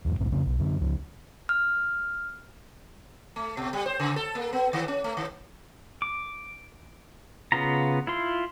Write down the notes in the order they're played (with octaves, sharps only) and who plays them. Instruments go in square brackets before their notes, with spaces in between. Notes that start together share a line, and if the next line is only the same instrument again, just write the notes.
[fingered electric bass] E2 G#2
E1 B1 G#2 C3
F2 C#3
B1
F#2 D3
C#2 F3
[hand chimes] F6
[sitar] A3
B2
G3
C5
C#3
A4
A#3
B3
D#3
C#4
A3
D#3
[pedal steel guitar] D6
C#3 B3 F4 A#5
E4 F4 C6